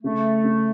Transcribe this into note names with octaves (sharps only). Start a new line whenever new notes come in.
C#3 A3
C#3